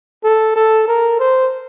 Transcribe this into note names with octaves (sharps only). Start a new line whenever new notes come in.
A4
A4
A#4
C5